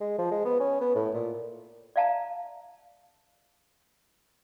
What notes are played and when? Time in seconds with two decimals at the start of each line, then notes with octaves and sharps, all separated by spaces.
0.01 G#3
0.19 F3
0.31 G#3
0.45 B3
0.60 C#4
0.81 B3
0.95 A2
1.14 A#2
1.96 D5 E5 F5 A5 A#5